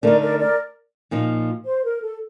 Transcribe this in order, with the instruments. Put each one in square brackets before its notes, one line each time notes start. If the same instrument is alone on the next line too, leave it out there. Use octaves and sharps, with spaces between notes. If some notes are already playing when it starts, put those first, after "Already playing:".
[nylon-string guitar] D3 A3 D#4 [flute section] A#4 D5
[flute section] A#4 D5
A#4 D5
[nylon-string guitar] A#2 F3 A#3 D#4
[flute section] C5
A#4
A4